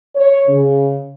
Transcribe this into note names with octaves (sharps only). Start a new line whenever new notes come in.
C#5
C#3